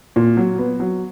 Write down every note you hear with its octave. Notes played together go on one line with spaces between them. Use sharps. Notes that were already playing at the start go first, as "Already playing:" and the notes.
A#2
F#3
B3
F#3